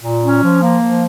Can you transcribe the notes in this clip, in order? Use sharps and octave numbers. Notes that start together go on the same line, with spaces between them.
A#2
C#4
F3
A#3
F3